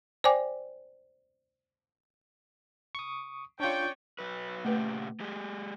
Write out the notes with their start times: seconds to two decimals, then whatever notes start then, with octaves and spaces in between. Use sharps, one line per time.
0.24 C5 D5 G5 G#5 D6
2.95 C#6 D#6
3.60 C#4 D4 F4 C#5 D5 G5
4.19 F#3 B4
4.65 A#2 C#3 A3 G4 B4
5.20 G#3 G4 G#4